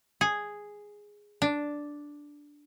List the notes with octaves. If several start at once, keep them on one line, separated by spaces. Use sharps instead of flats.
G#4
D4